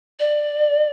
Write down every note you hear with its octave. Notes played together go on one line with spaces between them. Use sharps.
D5